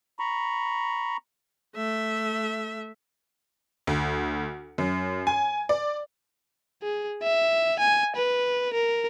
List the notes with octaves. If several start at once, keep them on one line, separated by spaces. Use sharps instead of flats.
A#5 B5 C#6
A3 E5
D2
F#2
G#5
D5
G#4
E5
G#5
B4
A#4